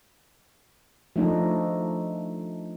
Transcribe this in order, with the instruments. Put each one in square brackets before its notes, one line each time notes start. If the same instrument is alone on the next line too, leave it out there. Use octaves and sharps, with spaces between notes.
[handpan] F3 A3 D4 D#4